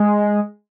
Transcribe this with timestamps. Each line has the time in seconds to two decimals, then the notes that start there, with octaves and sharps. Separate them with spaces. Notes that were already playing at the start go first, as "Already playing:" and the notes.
Already playing: G#3